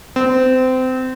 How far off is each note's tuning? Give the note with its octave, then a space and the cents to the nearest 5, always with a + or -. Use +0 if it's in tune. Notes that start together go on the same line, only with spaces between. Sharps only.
C4 -25